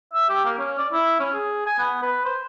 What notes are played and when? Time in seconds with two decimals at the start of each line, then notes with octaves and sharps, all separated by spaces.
0.13 E5
0.29 G4
0.45 A#3
0.58 C#4
0.78 D5
0.92 E4
1.20 C#4
1.34 G#4
1.67 G#5
1.79 B3
2.02 B4
2.25 C5